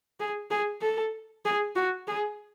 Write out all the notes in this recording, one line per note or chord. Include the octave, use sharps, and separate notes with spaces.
G#4
G#4
A4
G#4
F#4
G#4